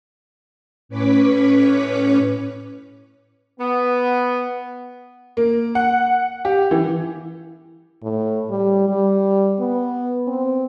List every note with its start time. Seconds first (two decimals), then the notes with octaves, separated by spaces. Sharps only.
0.89 A2 C#4 B4 C#5 D6 B6
3.59 B3
5.37 A#3
5.75 F#5
6.45 G4
6.71 E3
8.03 A2
8.51 G3
8.89 G3
9.60 B3
10.27 C4